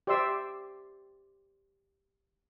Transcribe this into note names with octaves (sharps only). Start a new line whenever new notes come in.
G4 C5 D5 E5 C6 E6